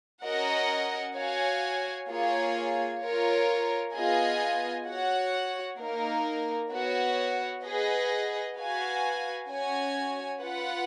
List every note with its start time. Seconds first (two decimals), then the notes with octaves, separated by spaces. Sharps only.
0.24 C#4 F#4 A#4 D#5 F#5
1.16 F#4 C#5 F5 G#5
2.09 A#3 F4 G#4 C#5 G#5
3.02 F4 A#4 C#5
3.94 B3 F4 G#4 D#5 G#5
4.87 F#4 C#5 F#5
5.79 A#3 D#4 A#4
6.71 B3 F#4 C#5
7.63 G#4 B4 D#5 F#5
8.57 F#4 B4 F5 G#5
9.49 C#4 F#4 C#5 G#5
10.42 F4 B4 F#5